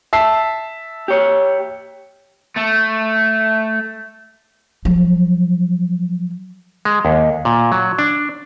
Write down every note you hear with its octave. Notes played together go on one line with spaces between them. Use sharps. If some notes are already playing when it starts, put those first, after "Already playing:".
E5 A5 C7
G4 C#5
A3
F3 F#3
G#3
D#2
A#2
F#3
D4